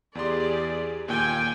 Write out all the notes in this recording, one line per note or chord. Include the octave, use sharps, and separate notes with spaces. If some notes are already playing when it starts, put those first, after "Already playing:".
E2 G4 G#4 D5 C6
D#2 A#2 G5 G#5